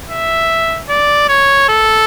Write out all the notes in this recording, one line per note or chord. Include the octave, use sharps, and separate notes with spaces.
E5
D5
C#5
A4